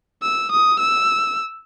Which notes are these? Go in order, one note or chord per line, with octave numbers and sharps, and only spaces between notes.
E6
D#6
E6